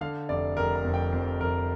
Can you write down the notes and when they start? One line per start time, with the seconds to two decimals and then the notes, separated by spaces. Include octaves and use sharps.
0.01 D3 F5
0.29 F1 D5
0.57 F1 A#4
0.75 A#5
0.85 F2
0.94 G5
1.13 F2
1.41 F1 A#4